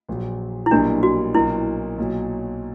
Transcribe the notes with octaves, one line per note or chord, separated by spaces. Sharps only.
A#1 A#2 F#3
E4
B1 A#2 G3 A#3 D4
F#4
B1 A#2 A#3 E4
B1 A#2 F#3